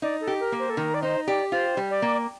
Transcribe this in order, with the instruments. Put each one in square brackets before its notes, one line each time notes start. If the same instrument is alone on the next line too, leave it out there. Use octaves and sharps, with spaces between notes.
[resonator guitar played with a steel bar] D#4 [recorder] D5
[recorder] A4
[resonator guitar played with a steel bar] G4
[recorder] A#4
[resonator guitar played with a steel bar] A#3
[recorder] C5
A4
[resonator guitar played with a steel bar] D#3 [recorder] A#4
[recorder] D5
[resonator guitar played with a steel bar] D#4 [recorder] C5
[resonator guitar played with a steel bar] G4 [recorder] D5
[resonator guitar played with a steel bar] F4 [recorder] C5
[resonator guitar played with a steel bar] G3
[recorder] D5
[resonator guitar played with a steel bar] A#3